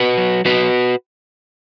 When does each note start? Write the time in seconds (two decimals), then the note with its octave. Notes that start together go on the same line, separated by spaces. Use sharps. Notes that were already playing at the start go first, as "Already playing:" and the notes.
Already playing: F#4 B4
0.18 F#3
0.45 F#3 F#4 B4